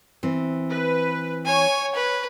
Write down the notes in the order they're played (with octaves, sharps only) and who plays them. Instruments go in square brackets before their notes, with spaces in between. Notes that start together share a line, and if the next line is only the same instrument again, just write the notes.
[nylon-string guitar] E3 C4
[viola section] B4
[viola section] C#5 [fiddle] G#5
[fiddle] B4